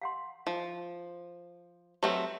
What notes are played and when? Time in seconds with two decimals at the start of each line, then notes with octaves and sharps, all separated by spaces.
0.02 F5 F#5 C6
0.47 F3
2.03 F#3 A3 C4 G4 B4 A5